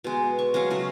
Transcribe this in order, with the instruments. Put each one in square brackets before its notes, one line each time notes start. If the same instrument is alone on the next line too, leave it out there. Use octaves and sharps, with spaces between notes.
[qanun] B2 G#3
C#6
F#3 G#3 C#4 F5
C#3 A3 F5 A#5